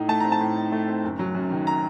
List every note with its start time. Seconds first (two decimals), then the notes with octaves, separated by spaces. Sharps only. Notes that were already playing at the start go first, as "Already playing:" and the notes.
Already playing: A2 D#4
0.08 A3 A5
0.20 C4 A#5
0.32 A5
0.40 A2
0.56 D#4
0.72 A3
0.88 C4
1.04 F#1
1.19 F#3
1.35 F#2
1.51 D#3
1.67 A#5